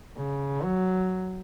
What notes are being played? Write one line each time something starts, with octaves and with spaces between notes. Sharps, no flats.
C#3
F#3